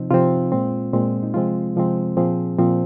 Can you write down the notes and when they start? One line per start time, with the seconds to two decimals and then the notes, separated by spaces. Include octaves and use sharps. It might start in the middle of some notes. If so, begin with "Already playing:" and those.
Already playing: C3 F3 C4 D#4
0.11 C3 F3 C4 F4
0.52 A#2 G#3 C4
0.93 A#2 G#3 C4
1.23 D#4
1.34 C3 F3 G#3 C4 F4
1.76 C3 F3 G#3 C4
2.17 A#2 F3 C4 G#4
2.58 A#2 F3 C4